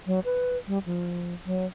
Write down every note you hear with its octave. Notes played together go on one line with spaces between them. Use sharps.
F#3
B4
G3
F3
F#3